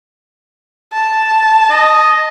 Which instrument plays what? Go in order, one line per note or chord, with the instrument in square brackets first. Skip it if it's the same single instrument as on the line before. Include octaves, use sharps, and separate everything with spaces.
[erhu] A5
[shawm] D#5